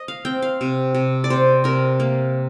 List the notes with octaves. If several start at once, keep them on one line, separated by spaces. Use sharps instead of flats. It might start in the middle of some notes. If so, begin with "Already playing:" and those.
Already playing: D#5
F5
C4 G5
F5
C3
C3
D5
C3 C5
C3 A#4
A#3